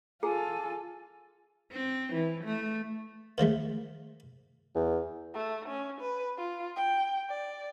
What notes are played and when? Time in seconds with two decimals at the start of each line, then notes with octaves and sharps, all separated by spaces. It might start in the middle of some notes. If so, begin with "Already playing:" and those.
0.23 F4 G#4 A4 G#5
1.72 C4
2.14 E3
2.45 A3
3.38 D#3 F3 G#3 A3
4.75 E2
5.34 A3
5.68 C#4
6.01 B4
6.38 F4
6.77 G5
7.30 D5